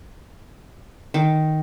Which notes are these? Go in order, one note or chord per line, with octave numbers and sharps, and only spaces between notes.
D#3